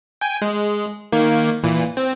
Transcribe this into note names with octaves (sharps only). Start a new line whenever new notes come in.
G5 G#5
G#3
D#3 A#3
A#2 E3
C4